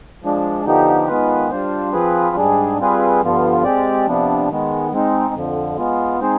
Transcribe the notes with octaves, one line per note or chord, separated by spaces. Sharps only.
F3 G#3 D4
D3 F3 B3 D#4 G4
D#3 G#3 B3 F4 B4
G3 D4 F4 C5
F3 C4 F4 G#4 B4
G#2 G3 D4 G#4
G3 C4 F4 G#4 B4
G2 D3 F3 B3 F4
G#3 C4 G4 D5
C3 F3 B3 D4
D#3 G#3 B3
G#3 C4 D#4
F2 D3 F3
G#3 B3 F4
G#3 C4 D#4 G#4 C5